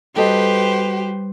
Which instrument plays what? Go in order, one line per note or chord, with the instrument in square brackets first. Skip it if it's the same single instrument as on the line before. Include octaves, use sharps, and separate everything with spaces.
[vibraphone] G3 [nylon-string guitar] F#4 A4 D#5 [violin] G4 [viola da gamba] B4 C5